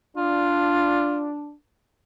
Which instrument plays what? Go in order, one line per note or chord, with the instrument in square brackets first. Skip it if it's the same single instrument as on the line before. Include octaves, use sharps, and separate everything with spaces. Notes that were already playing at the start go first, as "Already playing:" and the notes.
[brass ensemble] D4 [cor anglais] F4